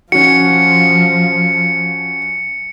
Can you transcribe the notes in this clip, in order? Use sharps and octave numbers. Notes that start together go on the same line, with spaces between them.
F3 C#4 F#4 C#7